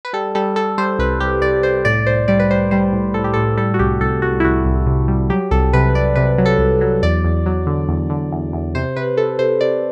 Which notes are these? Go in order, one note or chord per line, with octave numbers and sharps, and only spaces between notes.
B4
G3 A4
G3 A4
G3 A4
G3 C5
C2 B4
C2 G4
C2 D5
C2 C5
A2 D5
A2 C5
G3 D5
B4
G3 C5
G3 C5
A2
A2 A4
G4
A2 A4
G3 A4
F#4
C2 G4
C2 A4
C2 F#4
E4
C2 F#4
C2
C3
G3
F#3 G4
C2 A4
C3 B4
C2 D5
C3 B4
F#3
A4
C2
F#3
E2 D5
E2
F#3
D3
E2
D3
E2
E2
C3 C5
C3 B4
C3 A4
C3 C5
C3 D5